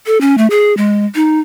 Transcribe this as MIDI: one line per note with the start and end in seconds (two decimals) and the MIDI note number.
0.06 0.20 69
0.21 0.38 61
0.38 0.47 57
0.50 0.76 68
0.77 1.05 56
1.15 1.40 63